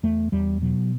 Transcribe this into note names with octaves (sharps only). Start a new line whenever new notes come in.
E2 A3
E2 G3
B2 F#3